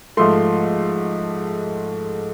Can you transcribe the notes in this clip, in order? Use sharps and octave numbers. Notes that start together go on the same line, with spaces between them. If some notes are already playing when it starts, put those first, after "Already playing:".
G#2 F3 A3 C6